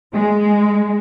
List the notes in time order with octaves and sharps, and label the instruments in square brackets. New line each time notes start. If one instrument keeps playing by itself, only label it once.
[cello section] G#3